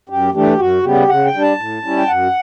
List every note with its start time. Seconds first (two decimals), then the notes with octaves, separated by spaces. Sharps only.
0.09 F#2 G4
0.34 E3 A3 D4 G4
0.59 F#2 F#4
0.83 C#3 G3 B3 G4
1.09 C#3 F#5
1.25 G5
1.34 G3 D4
1.42 A5
1.58 A2
1.84 G3 C#4 E4
1.98 G5
2.08 F#2 F#5